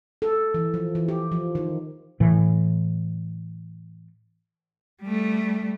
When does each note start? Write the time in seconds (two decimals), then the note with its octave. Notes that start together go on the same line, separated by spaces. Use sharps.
0.22 A4
0.54 E3
0.74 F3
0.95 E3
1.08 G4
1.32 F3
1.55 D#3
2.20 A2 E3
5.02 G3 A3